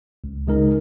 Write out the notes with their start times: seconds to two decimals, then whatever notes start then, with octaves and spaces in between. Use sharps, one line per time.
0.24 C#2
0.47 C#3 G#3 D#4 A#4